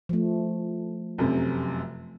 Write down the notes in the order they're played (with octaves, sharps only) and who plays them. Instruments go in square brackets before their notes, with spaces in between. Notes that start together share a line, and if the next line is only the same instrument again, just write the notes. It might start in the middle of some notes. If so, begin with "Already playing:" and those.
[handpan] F3 A3
[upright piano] F1 F#2 C3